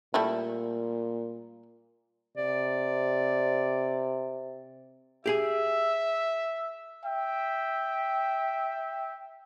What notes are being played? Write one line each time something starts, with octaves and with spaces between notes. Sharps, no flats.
A#2 G3 A3 E4
C3 D5
G4 G#4 E5 G#5
E5 G5